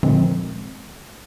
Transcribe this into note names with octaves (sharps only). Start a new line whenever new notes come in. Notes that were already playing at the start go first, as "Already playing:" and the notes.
A#2 D3 D#3 F3 G#3 C4